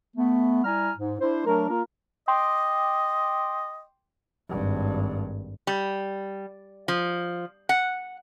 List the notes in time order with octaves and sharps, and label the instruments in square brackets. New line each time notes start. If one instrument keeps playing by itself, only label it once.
[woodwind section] A3 B3
G3 E4 G#5 A#5 F6
G#2
D4 E4 C5
F#3 A3 D4 A#4
A#3 F4 A#4
[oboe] D#5 [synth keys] G5 C6 D6
[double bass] G#1 G2
[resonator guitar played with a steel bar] G3
F3
F#5